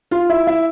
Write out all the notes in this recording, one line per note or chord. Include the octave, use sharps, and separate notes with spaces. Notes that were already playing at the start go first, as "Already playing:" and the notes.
F4 F5
E4 E5
E4 E5